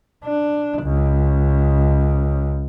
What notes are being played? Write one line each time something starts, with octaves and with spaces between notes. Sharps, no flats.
D4
C#2